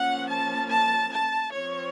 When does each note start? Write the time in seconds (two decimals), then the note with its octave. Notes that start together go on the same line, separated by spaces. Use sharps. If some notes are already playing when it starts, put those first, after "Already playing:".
Already playing: F3 A#3 C#4 F#5
0.29 A5
0.70 A5
1.12 A5
1.51 F3 C4 C#5